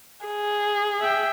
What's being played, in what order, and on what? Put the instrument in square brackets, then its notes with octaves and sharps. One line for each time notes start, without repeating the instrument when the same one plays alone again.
[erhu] G#4
[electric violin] E5 G5